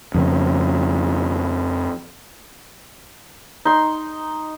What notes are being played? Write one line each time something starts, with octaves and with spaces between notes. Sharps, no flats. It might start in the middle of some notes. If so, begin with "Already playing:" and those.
F2 C#3
D#4 C6